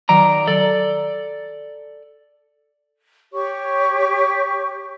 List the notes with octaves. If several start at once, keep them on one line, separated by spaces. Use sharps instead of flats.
D#3 F#3 D5 A#5
A4 D5
G4 C#5 C#6